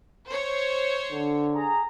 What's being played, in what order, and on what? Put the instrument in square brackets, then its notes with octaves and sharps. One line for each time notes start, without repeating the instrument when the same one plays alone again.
[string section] C5 C#5
[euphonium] D3
[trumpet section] G#4 A#5